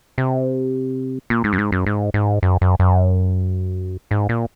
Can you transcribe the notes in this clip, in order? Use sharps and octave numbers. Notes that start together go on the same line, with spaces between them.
C3
A#2
G#2
F#2
G#2
F#2
G#2
G#2
F#2
F#2
F#2
G#2
A#2